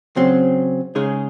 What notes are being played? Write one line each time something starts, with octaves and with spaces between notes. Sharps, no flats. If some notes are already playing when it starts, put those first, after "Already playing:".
C#3 F#3 C4
C#3 G#3 D#4 G#4